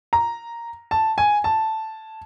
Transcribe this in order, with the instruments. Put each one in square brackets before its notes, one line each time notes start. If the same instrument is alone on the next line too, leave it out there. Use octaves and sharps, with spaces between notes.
[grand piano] A#5
A5
G#5
A5